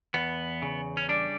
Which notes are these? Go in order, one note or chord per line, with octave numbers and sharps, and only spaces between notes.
E2 B3
C#3
C#4
G3 D4